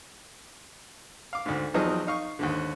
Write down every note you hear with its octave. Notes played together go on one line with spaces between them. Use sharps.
F5 D6
D2 G#2
E2 F3 F#3 C4 D#4 G#4
D#4 F5 C#6
D#2 G#2 D3